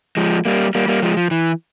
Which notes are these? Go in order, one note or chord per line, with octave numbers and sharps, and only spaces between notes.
F3 G#3
G3 A#3
G3 A#3
G3 A#3
F3 G#3
F3
E3